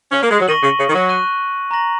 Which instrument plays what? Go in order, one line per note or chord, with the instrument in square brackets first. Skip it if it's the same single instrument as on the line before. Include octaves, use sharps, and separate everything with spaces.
[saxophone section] C#4
A#3
G#3
F#3
[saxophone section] D#3 [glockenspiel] C#6 A#6 D#7 F#7
[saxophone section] C#3
C#3
D#3
F#3
[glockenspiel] C#6 F#6 D#7
A#5 C#6 A#6 F#7